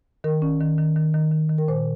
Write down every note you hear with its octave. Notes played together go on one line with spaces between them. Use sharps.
D#3 A#4
C#4
D#3
D#3
D#3
D#3
D#3
D#3
A#4
A#2 C5